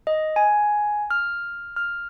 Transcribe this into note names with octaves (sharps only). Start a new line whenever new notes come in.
D#5
G#5
F6
F6